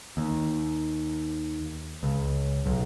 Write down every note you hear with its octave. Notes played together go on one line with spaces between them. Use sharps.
D#2
C#2
B1